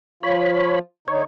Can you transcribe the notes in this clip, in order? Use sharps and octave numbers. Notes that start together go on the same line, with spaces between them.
F3 F4 C#5 B5
D3 D#4 C#5